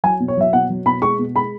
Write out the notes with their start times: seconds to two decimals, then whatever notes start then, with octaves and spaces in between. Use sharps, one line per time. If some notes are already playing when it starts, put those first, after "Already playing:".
0.04 F#3 G#5
0.20 B2
0.28 C#5
0.37 F#3 E5
0.53 B2 F#5
0.70 F#3
0.86 B2 B5
1.02 G#3 C#6
1.19 B2
1.35 G#3 B5